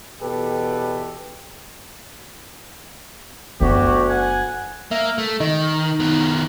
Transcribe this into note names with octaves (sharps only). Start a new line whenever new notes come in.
E2 B2 G4 A4 B4
F#1 D2 B3 F#4 G4 C#5
F#5 G#5
A#3 E5
A3
D#3 D#4
D#3 B3